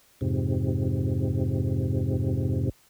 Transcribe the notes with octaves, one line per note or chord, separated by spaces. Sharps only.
F2 G#2 C3